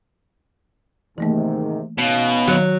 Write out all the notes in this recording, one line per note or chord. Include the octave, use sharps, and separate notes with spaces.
G#2 C3 D#3 E3 A3 A#3
B2 C#4 D#4 F5
D#3 F#3